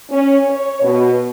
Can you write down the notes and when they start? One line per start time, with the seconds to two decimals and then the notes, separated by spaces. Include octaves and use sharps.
0.11 C#4
0.48 C#5
0.82 B2